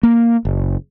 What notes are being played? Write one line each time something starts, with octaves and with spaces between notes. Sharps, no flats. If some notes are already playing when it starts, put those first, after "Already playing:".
A#3
F#1